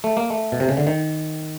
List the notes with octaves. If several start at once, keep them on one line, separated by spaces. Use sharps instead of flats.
A3
A#3
A3
B2
C3
C#3
D3
D#3